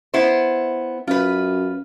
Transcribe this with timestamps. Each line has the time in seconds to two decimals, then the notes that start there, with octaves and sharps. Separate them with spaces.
0.14 B3 E4 C5
1.07 F#2 F4 B4